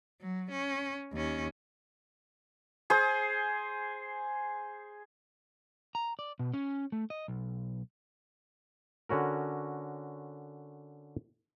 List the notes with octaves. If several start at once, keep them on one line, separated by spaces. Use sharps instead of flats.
F#3
C#4
D#2 C#4
G#4 C5
A#5
D5
B2
C#4
A3
D#5
B1
D3 C#4 F#4 A#4